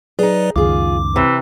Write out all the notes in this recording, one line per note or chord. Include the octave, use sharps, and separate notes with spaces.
F#3 D#4 G#4 B4 D5
C#2 F#2 D#3 F4 G#4 D6
C3 E3